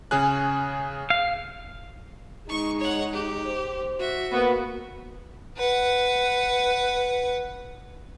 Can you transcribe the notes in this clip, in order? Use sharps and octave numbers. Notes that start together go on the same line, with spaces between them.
C#3 C#4 G#4 F#6
F5
G#3 D#4 C#6
C#5 F#5
G4
C5
F#4 E5
A#3 B3
B4 F#5